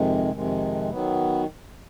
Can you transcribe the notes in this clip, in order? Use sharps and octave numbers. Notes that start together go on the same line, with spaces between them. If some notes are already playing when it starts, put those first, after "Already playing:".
Already playing: F2 C3 D#3 G#3
F2 C3 D#3 G#3
D#3 F#3 B3